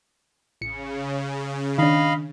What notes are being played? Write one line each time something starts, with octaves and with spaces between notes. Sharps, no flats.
A1 C#3 C#7
D#3 D4 D#5 F5 B5